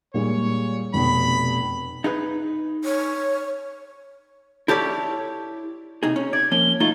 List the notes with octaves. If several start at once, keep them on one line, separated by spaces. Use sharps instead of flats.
A#2 G3 G#3 C#5
F1 B2 B5
D#4 G#4 B4
C#5
E4 G4 A4 C#5 D5
C3 D#4 G#4
C#4
D5 G#6
F3 A#3 C#4 G7
A3 D#4 F4 G7